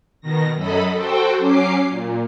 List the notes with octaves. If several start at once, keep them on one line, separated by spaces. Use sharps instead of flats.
B2 D#3 A#6
F#2 F#3 A4 D#5 B5
F#4 A4 C5 G5
F#3 C#4 D6 C7
A#2